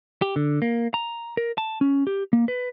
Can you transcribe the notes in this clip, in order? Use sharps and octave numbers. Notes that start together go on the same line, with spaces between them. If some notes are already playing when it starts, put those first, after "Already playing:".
G4
D3
A#3
A#5
A#4
A5
C#4
G4
A#3
B4